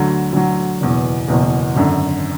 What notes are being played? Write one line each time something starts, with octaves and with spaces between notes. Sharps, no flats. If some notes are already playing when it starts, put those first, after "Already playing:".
Already playing: D2 D3 F#3
D2 D3 F#3
F#1 E2 B2
F#1 E2 B2
G#1 F#2 D3